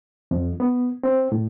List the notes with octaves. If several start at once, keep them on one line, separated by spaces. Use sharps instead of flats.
F2
B3
C4
A2